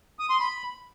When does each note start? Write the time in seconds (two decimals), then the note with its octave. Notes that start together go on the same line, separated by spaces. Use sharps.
0.19 D#6
0.30 C6
0.40 B5